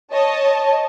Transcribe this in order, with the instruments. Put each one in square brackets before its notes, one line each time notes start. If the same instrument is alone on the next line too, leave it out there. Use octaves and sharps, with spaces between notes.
[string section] C#5 D#5 A5